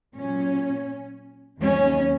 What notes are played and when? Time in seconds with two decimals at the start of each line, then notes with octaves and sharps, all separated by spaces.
0.17 A#2 F#3 C#4
1.60 D#2 D#3 F#3 C#4